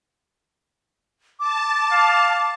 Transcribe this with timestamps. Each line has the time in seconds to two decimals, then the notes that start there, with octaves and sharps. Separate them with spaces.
1.40 A5 D6
1.92 F5